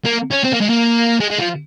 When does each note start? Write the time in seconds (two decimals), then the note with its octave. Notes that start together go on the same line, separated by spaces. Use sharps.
0.06 A#3
0.32 C#4
0.44 C4
0.53 A#3
0.61 G#3
0.70 A#3
1.20 G#3
1.30 G#3
1.39 F3